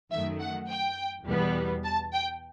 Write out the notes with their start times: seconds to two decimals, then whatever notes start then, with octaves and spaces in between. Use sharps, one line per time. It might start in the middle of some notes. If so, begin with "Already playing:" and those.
0.11 F#2 D#3 A3 E5
0.40 F#5
0.69 G5
1.27 E2 B2 G3 B3
1.84 A5
2.13 G5